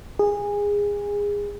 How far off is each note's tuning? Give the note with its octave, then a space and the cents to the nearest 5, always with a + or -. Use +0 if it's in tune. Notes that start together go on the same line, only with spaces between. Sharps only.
G#4 -20